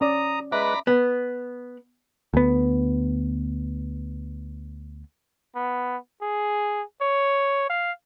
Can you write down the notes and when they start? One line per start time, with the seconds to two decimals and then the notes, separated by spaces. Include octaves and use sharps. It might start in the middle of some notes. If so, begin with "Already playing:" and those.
0.01 C#4 D5 A#5 D#6
0.52 G#3 B4 D5 E5 A#5 B5 F#6
0.87 B3
2.34 D2 B3
5.55 B3
6.22 G#4
7.01 C#5
7.70 F5